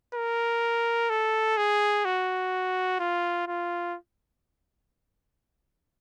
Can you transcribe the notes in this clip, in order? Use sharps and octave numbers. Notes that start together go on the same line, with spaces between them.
A#4
A4
G#4
F#4
F4
F4